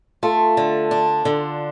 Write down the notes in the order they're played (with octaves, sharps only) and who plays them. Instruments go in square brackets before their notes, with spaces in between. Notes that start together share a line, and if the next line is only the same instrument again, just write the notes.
[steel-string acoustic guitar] A3 [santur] F4 A4
[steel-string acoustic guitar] D3
D4
D3